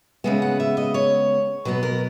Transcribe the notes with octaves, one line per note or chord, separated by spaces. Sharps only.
C#3 G#3 B3 E5
F#5
E5
D#5
C#5
B2 F#3 B3 B4
A#4